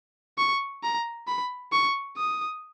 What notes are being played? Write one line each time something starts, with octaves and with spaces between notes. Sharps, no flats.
C#6
A#5
B5
C#6
D#6